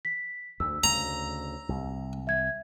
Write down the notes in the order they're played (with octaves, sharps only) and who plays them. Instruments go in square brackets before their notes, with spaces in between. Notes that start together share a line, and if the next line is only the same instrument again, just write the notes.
[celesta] B6
[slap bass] D2 [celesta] E6
[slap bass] D2 C#3 [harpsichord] A#5
[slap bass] C2
[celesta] E5 G#6